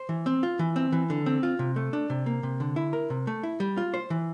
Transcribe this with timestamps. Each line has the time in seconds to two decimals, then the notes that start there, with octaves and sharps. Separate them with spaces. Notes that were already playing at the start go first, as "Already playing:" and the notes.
Already playing: C5
0.09 E3
0.26 C4
0.43 F4
0.59 E3
0.76 C4
0.92 E3
1.10 D3
1.26 C4
1.43 F4
1.59 C3
1.76 A3
1.93 D4
2.10 C3
2.26 A#3
2.43 C3
2.60 D3
2.76 E4
2.93 A#4
3.10 C3
3.27 A3
3.43 E4
3.60 G3
3.77 F4
3.94 C5
4.10 E3